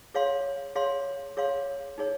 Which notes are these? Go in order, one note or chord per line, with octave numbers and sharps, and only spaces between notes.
G#4 C#5 F5 C6
G#4 C#5 F5 C6
G#4 C#5 F5 C6
D#4 G#4 C#5